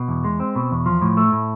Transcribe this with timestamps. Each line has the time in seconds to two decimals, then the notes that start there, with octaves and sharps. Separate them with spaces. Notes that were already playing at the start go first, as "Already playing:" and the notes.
Already playing: B2
0.08 E2
0.24 G#3
0.40 C4
0.56 B2
0.71 E2
0.86 F3
1.02 A2
1.17 A3
1.32 A2